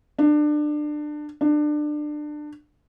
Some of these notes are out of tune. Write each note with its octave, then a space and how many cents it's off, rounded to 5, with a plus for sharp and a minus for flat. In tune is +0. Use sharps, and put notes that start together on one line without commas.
D4 +25
D4 +25